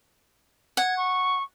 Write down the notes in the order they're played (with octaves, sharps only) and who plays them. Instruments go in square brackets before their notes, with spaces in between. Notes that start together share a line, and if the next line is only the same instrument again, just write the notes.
[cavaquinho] F#5 [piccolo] G#6
[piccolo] C#6